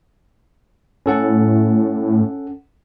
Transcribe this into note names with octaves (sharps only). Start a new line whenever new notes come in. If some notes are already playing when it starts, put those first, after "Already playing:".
A2 C#4 A4 F#5